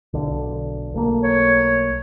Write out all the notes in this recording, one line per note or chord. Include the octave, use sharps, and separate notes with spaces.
B1 D3
B1 A3 A#3
C#5